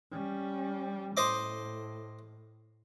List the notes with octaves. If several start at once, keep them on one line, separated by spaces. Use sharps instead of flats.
G3 C#4
A2 C5 D#5 D6